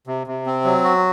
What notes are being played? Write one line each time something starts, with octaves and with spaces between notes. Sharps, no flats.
C3
C3
C4
F#3
F#4